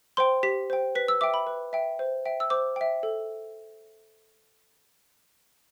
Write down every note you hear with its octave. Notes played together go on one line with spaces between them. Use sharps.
C5 G5 C6
G4 B6
C5 G5
B4 B6
E6
E5 G5 D6
B5
B4
E5 G5
C5
E5 G5
E6
C5 D6
E5 G5
A4